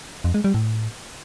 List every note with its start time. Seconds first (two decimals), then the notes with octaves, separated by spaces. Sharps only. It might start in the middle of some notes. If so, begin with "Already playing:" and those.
0.24 F2
0.34 G#3
0.44 G3
0.54 A2